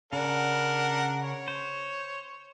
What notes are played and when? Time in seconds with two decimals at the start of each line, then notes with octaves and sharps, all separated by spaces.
0.13 C#3 D4 A#4 F#5
1.23 C#5
1.48 C5